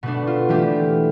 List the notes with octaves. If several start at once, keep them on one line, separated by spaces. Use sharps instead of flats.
B2 A3 D4 B4
F4
E3 A3 D4 G4